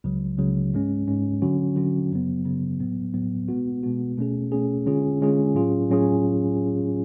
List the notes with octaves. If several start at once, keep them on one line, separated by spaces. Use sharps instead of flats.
C#2 C#3 F#3
C#2 C#3 F#3
G#2 G#3 C#4
G#2 G#3 C#4
D3 F#3 C#4 F#4
D3 F#3 C#4 F#4
F#2 C#3 F#3 B3
F#2 C#3 F#3 B3
A2 F#3 B3
A2 F#3 B3
B2 G#3 B3 F#4
B2 G#3 B3 F#4
B2 A3 C#4 G#4
B2 A3 C#4 G#4
D3 G#3 C#4 F4 G#4
D3 G#3 C#4 F4 G#4
A2 F#3 C#4 F4 G#4
A2 F#3 C#4 F4 G#4